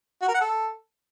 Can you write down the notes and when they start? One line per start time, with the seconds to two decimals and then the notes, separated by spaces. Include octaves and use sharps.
0.22 F#4
0.28 A#4
0.34 F#5
0.41 A4